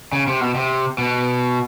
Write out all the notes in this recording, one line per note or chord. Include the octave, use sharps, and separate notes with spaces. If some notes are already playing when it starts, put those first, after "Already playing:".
C#3
C3
B2
C3
B2